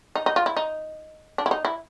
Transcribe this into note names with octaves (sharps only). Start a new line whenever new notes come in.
D#4
D#4
F4
E4
D#4
D4
E4
D#4
E4